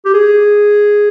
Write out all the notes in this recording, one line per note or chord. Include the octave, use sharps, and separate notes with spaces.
G4
G#4